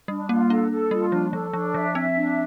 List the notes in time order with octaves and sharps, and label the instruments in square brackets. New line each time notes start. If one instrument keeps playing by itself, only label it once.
[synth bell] G3 [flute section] D4
[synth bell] A#3 [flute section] F4
[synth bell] D4 [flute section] A4
[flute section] A4
[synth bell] G3 [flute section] F4
[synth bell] F3 [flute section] D4
[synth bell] F3 [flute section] A4
[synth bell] F3 [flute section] D4
[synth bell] F3 [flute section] E5
[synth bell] C4 [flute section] E5
[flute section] D4